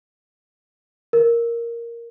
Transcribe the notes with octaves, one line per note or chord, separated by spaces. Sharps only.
A#4